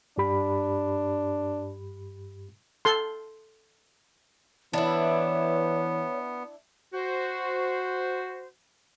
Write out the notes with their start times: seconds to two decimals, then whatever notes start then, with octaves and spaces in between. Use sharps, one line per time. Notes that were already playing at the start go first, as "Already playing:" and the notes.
0.18 G2 D4 G4 B5
2.85 A4 C6
4.73 E3 B3 D4 E4 C#5
6.94 F#4 C5